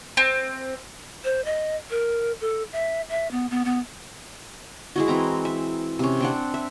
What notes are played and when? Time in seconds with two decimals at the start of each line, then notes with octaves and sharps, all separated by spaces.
0.17 C4
1.25 C5
1.45 D#5
1.90 A#4
2.41 A4
2.72 E5
3.09 E5
3.31 B3
3.51 B3
3.65 B3
4.96 G#3 E4 F#4
5.08 E3 C4 A#5
5.45 E5
5.99 C3 C#4
6.20 C4 D4 F#5
6.54 E5